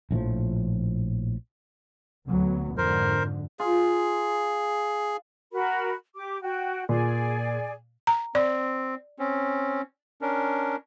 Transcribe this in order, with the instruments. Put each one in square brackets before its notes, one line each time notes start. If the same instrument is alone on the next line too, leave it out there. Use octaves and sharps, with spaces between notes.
[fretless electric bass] A#1 A2 E3 F3
[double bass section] D2 F#3 B3
[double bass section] F2 G#2 D3 [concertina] A#4 C5
[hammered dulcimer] F4 [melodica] G#4
[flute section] F#4 A#4 B5
G4 D6
F#4 G5
[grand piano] A#2 [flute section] G#4 D5 G#5
[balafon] A#5
[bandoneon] C4 [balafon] D5
[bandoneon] C4 C#4
C#4 D4 A#4